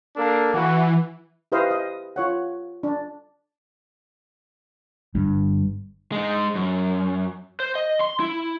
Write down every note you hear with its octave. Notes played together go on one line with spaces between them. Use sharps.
A#3 D4 A4
E3 F#4 F#5
E4 G4 B4 C5 D#5 F5
D#5
F4 C#5 F#5
D4
G1 G2
G#3 D#4
F#2
C5
D#5
C6
E4